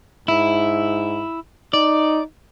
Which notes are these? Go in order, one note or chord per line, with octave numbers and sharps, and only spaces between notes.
G#2 E4
D#4 D5